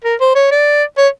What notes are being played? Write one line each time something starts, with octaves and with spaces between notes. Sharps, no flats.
A#4
C5
C#5
D5
C#5